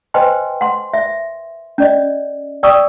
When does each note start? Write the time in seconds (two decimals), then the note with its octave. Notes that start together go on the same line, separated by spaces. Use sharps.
0.14 B4 C5 D#5 G5 G#5 C6
0.61 F#5 C6
0.94 E5
1.78 C#4 D5 D#5
2.63 D5 G5 C#6 D#6 E6